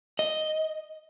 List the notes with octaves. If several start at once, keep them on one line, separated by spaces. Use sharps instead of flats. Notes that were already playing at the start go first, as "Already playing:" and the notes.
D#5